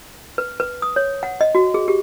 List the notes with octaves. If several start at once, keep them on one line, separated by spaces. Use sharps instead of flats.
B4
B4
D#6
C#5
F#5
D#5
F#4
G#4
G4